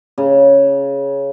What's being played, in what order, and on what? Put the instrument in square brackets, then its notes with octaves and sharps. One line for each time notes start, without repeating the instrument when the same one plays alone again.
[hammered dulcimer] C#3